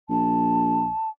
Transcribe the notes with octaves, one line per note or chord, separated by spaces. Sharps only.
A#1 A5